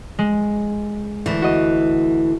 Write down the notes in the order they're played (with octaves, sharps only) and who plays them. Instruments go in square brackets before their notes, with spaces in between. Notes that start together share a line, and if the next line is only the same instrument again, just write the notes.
[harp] G#3
[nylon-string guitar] D2 E3
[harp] F#4 D#5